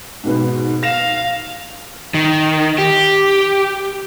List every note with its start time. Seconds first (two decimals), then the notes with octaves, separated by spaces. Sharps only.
0.23 G#2 B2 B3
0.83 F5 A#6 E7
2.14 D#3
2.78 G4